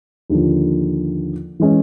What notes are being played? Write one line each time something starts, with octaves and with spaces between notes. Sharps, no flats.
D#2 D3 F3
E3 G#3 C#4